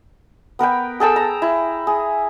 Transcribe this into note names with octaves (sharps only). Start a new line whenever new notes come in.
B3 A#4 B4 G5
G#4 A4 G5 E6
A#5
E4
G#4